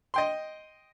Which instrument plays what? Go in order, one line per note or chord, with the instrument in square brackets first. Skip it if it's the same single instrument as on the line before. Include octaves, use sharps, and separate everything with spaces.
[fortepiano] D#5 G5 C6